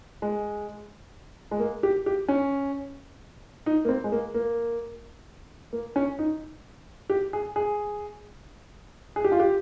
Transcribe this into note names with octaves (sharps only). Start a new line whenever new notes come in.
G#3
G#3
A#3
G4
G4
C#4
D#4
A#3
C4
G#3
A#3
A#3
A#3
C#4
D#4
G4
G#4
G#4
G#4
G4
F4
G4